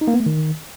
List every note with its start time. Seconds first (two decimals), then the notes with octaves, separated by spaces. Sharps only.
0.01 D#4
0.08 A#3
0.14 B3
0.20 A3
0.26 D#3